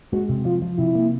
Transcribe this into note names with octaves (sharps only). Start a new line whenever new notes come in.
G#3 F#4
C3
F3 F4
F3
C3 E4
A#3